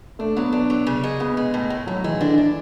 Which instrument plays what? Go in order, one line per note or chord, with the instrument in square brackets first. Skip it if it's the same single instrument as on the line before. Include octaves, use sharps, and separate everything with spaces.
[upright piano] A3 [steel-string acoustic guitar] D4
[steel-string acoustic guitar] F#3 [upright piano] B3
[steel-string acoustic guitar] D4
F#3
C#3
G#3
[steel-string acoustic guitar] C#3 [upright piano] B3
[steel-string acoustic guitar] G#3
A2
A2
[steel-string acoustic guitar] A2 [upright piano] F#3
[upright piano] E3 [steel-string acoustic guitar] G#3
[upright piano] D3 [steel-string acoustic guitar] D4
[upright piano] E3 [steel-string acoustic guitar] D4